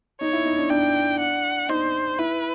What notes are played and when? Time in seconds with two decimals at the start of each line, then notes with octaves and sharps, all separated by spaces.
0.21 D#4 C#5
0.33 E4
0.45 D#4
0.58 D4
0.70 D4 G5
1.19 F#5
1.69 D#4 C5
2.19 E4 B4